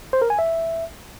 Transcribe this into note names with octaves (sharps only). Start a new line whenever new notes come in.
C5
A#4
G#5
E5